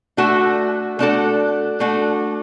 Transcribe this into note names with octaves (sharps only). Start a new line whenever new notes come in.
A3 D4 F#4 A4
A3 D4 F#4 A4
A3 D4 F#4 A4